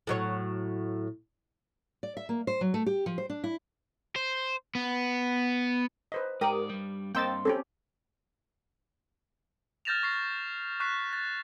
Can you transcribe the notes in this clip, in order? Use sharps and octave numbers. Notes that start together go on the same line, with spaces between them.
A2 F#3 C#5
D5
E5
A#3
C5
F#3
A3
G4
F3
C5
D4
E4
C5
B3
B4 C5 D#5
G#2 G4 A#4 D5 D#6
G2 G3
G2 A#3 C4 D#5 G5 C6 E6 A6
C4 C#4 G4 A4
F6 G6 A6 A#6 E7 F7
C#6 A#6 C7
C#6 F#6 B6 C7
A6